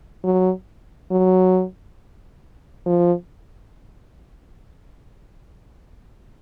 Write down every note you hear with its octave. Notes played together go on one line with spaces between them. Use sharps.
F#3
F#3
F3